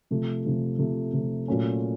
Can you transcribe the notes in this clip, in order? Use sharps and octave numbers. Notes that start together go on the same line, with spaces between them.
C3 F3 A3
C3 F3 A3
C3 F3 A3
C3 F3 A3
A#2 F#3 A3 C#4 F4